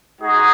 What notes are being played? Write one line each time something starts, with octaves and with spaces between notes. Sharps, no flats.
G#3 D#4 F#4 G#4